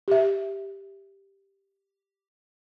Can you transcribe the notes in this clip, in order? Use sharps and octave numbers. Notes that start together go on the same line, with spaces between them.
G4 E5